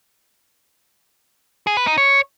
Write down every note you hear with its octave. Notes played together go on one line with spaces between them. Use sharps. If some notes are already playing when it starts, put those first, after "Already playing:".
G#4
B4
D#4
C#5